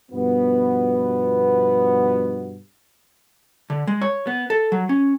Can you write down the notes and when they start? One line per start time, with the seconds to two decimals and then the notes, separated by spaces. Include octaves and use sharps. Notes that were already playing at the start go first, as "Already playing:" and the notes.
0.11 G2 B2 F3 B3
3.70 D3
3.87 G#3
4.01 C#5
4.27 B3
4.50 A4
4.72 F#3
4.89 C#4